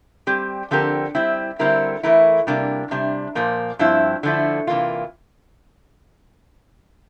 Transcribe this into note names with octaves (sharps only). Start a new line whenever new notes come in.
G3 C4 G4
D3 F3 C4 G4 A#4
G3 C4 E4
D3 G3 C4 E4 A#4
E3 A3 E4 A#4
C3 G3 A#3 D4
C3 G3 D4
A#2 F3 A#3
G2 F3 C4 E4
D3 F3 A3 E4
C3 E3 A#3 F4